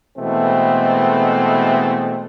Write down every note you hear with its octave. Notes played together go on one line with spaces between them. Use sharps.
B2 E3 G#3 A3 C4